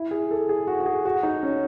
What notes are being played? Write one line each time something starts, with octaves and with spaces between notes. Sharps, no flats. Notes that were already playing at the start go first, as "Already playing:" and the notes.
Already playing: E4
G#4
A4
G#4
F#4
F#4
G#4
F#4
D#4
C#4